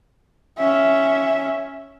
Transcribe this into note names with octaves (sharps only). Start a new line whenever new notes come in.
C#4 E5